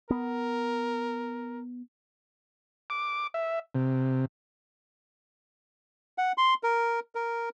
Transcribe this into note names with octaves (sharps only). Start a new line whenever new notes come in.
B3 A#4
D6
E5
C3
F#5
C6
A#4
A#4